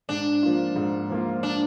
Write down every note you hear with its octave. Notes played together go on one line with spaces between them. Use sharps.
G#2 D4
F3 A#3 F4
G#2
F3 A#3 F4
D4